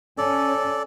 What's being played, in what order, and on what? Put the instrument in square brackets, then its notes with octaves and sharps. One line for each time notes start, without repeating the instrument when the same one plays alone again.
[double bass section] C#4 [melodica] A4 D5